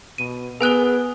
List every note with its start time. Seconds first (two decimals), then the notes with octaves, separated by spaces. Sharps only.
0.18 B2 D#7
0.61 B3 G#4 A#4 G#5 F#6 G7